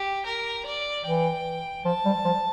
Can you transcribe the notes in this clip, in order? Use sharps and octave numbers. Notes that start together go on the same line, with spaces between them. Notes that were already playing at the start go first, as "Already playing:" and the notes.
Already playing: G4
A#4
D5
E3 G5
F3 A5
G3
F3